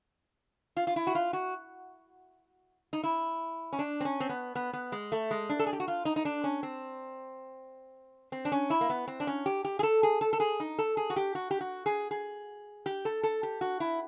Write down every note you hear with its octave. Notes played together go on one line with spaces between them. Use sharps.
F4
F4
E4
F#4
F4
F#4
D#4
E4
C#4
D4
C4
C#4
C4
B3
B3
B3
G#3
A3
G#3
D4
A4
G#4
G4
F#4
F4
D#4
D#4
D4
C#4
C4
C4
D4
C#4
E4
A#3
B3
C4
D4
C#4
G4
G4
G#4
A4
G#4
A4
A4
G#4
D#4
A4
G#4
F#4
G4
F#4
G4
F#4
G#4
G#4
G4
A4
A4
G4
F#4
E4